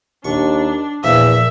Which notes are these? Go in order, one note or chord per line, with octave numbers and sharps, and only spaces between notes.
D#2 D4 C#6
E2 A#2 F3 E5